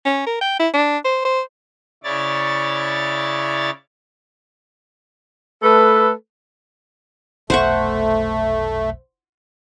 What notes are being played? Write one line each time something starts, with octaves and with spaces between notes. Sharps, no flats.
C#4
A#4
G5
E4
D4
C5
C5
C#3 E4 C#5 D5 A6
A3 A4 B4
F1 B1 A3 C5 F#5 C#6